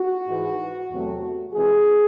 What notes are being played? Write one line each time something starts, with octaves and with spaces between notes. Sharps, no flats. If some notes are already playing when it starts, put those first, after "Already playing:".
Already playing: F#4
G#2 E3 G#3
E2 C3 F#3 A3
C3 E3 G#3 G#4